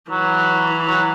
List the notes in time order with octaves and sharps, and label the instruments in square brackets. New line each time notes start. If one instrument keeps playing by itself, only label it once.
[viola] E3 [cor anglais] F#3
[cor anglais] F#3